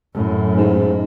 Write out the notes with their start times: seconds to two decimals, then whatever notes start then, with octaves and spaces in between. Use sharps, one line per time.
0.13 F#2 A2
0.57 G#2